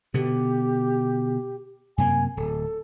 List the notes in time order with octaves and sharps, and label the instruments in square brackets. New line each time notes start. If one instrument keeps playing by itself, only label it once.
[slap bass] B2 D3 B3 [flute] G4
[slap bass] F#2 C3 A#3 [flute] G#5
[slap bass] D1 [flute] A4